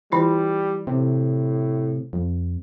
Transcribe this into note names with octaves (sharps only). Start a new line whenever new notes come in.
E3 G3 E4 F4
A2 C3
F2